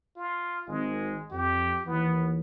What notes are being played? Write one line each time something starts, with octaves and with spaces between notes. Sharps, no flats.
F4
G#1 G#3
F2 G4
D#2 E3 B3